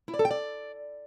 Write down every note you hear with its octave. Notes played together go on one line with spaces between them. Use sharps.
E4
D5
A4
G5
D5